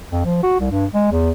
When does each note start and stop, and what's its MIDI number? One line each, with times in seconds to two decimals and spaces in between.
0.12 0.25 41
0.25 0.42 53
0.43 0.57 66
0.60 0.69 36
0.72 0.85 43
0.94 1.07 56
1.11 1.31 40